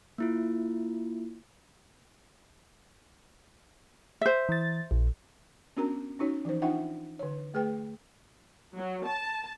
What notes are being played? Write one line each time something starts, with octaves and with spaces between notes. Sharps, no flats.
A#3 E4 F4
C5 E5
E3 A6
A#1
B3 C#4 D4 F#4 A#4 A#5
C#4 D#4 F#4 C#5
E3 F3 D#4 C5
D4 D#4 F4 E5 F#5 G5
D3 C#5
A3 G#4 B4 G5
F#3
A5